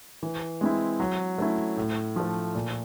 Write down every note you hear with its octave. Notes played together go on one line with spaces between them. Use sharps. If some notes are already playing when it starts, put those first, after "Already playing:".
E3
G#3 C4 E4
F#3
A3 C#4 E4
A2
F3 A3
A#2